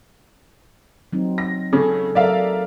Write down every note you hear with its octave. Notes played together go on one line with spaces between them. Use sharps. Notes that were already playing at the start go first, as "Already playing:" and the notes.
F#3 C4 D#4
A#6
C#3 C#4 G#4 A4
F#3 A4 A#4 D5 E5 F5